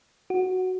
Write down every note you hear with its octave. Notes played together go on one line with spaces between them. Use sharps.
F#4